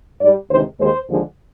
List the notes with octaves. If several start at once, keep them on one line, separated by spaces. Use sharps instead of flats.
G#2 G3 D5
D2 C3 D#3 G#3 C5
D#2 D#3 G#3 C5
D#2 D3 F3 G#3